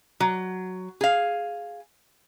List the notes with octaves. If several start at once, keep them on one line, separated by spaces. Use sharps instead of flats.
F#3
G#4 F5